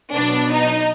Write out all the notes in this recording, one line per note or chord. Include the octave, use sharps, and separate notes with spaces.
B2 F#3 B3 D4
D#4